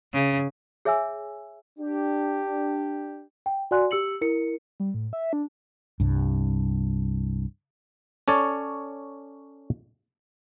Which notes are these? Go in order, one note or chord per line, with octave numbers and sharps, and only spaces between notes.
C#3
G#4 C#5 E5 G#5 E6
D4 G4
G5
F#4 D5 F#5 G#5 C6 F#6
G4 E6 C#7 F#7
E4 A#4 C#7
G3
A2
E5
D4
C2 G2
C#4 A4 C#5 D5